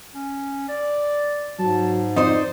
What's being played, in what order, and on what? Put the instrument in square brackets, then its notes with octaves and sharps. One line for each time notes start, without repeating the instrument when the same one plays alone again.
[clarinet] C#4
D5
[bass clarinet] G#2 [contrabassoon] F#3 [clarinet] A5
[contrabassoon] F2 [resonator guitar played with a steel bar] D#4 C5 [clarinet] D5